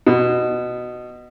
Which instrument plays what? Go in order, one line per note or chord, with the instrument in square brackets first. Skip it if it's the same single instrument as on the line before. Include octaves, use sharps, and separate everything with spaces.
[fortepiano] B2